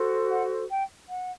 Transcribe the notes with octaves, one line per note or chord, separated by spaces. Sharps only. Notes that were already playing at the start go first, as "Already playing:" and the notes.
Already playing: F#4 A4 C5
F#5
G5
F#5